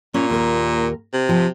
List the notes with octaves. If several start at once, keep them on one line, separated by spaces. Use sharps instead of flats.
A#2 C#4
D#2 A#4
C3
F3 G4